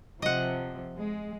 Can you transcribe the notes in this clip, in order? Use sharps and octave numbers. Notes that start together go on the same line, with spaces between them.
C3 F3 D#5 F#5
G#3